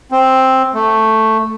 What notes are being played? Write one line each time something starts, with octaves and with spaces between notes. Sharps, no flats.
C4
A3